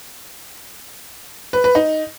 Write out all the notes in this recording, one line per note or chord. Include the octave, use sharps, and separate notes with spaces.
B4
B4
D#4